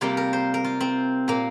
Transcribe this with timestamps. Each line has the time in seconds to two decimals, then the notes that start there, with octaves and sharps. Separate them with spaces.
0.01 C3 G3 A#3 F4
0.17 A#4
0.33 C5
0.54 A#4
0.64 F4
0.80 C4
1.28 A#2 A#3